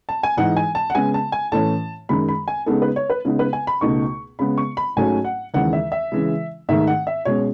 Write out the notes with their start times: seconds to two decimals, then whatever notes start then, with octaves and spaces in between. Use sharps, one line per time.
0.09 A5
0.23 G#5
0.37 G#2 E3 G#3 D#4 F#5
0.57 G#5
0.75 A5
0.90 F#5
0.95 C#3 G#3 B3 G#5
1.14 A5
1.32 G#5
1.52 A2 E3 A3 C#4 A5
2.09 F#2 D#3 G#3 B5
2.29 B5
2.48 G#5
2.66 C#3 G#3 B3 D#4 A4
2.82 B4
2.96 C#5
3.10 B4
3.25 C#3 G#3 B3 D#4
3.39 B4
3.53 G#5
3.67 B5
3.81 C#2 B2 A3 D#4 C#6
4.39 C#3 G#3 B3 B5
4.58 C#6
4.77 B5
4.96 G#2 F#3 A3 C#4 G#5
5.25 F#5
5.54 D#2 C#3 E3 G#3 F#5
5.73 E5
5.92 E5
6.12 C#3 E3 G#3
6.69 G#2 D#3 A3 E5
6.87 F#5
7.07 E5
7.25 B2 G#3 C#4 C#5